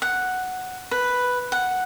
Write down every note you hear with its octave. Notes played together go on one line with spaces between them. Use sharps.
F#5
B4
F#5